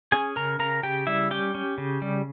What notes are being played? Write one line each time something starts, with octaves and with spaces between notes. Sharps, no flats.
C#4 G#4 G#5
C#3 A#4 A#5
C#3 A#4 A#5
C#3 G4 G5
G3 E4 E5
C#4 G4 G5
C#4
C#3
G3